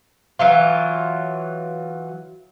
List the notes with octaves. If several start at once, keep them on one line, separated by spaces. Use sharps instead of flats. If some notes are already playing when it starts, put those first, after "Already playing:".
E3 F#3 F4